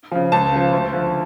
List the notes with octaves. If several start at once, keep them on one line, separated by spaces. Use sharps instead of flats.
C#3 F3
C#2 A5
C#3 F3
D2
D3 F3